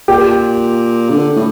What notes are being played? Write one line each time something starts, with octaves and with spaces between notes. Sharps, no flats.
A#2 G4
D3
A2